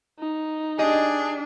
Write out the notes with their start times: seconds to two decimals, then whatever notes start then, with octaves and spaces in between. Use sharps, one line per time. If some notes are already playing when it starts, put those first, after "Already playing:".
0.19 D#4
0.79 D4 G4 G#4 D#5